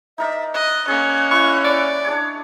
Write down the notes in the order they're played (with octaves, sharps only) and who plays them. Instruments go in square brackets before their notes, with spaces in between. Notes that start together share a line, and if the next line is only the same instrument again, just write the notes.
[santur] D#4 A#4 D5 [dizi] E5
[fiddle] D#5 [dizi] F#6
[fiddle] A#3 C#4 [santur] G#4
[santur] E4 [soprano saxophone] C#6
[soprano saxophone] D5
[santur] D4 G#4 C#5